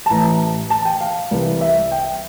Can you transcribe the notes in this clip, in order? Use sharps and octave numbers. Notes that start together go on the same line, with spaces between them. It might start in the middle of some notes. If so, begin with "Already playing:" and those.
A5
A1 A2 E3 A#5
A5
G5
F5
C2 C3 E3
E5
G5